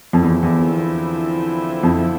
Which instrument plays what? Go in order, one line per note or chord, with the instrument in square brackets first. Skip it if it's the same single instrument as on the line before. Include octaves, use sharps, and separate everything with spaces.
[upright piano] F2 [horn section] D3 F3 C4 E4
[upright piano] E2
E2
F2